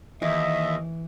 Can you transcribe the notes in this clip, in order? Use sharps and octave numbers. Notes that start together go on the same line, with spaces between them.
D#2 E3 D#5 E5